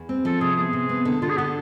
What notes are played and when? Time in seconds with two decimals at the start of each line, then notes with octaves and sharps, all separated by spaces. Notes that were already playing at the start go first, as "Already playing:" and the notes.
Already playing: E2
0.09 C4
0.25 F3 A4
0.41 C3 G#4
0.56 B3 G#4
0.73 C3
0.89 B3
1.05 D3
1.22 D3 F4
1.29 G#4
1.37 D3 B3